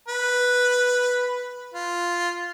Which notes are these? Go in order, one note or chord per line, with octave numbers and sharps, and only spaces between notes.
B4
F4